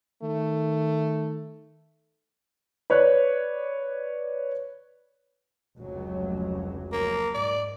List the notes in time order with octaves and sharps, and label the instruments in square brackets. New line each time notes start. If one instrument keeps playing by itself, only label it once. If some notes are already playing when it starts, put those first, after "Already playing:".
[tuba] D#3 [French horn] A3
[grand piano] B4 C#5 D5 F#6
[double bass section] F1 C#2 F#3
[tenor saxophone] A#3
[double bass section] G#2 [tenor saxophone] D5